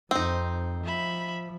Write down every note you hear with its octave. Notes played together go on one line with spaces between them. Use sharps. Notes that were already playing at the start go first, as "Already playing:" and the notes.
F2 C4 D#4
F3 E5 B5